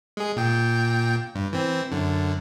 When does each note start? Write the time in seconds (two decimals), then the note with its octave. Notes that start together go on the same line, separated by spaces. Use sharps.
0.17 G#3 G#4
0.36 A#2 G5
1.35 G2
1.53 E3 C4
1.92 F#2 D3